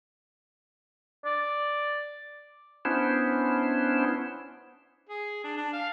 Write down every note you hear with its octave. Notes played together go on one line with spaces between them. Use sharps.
D5
B3 C#4 D4 E4 C5
G#4
D4
D4
F5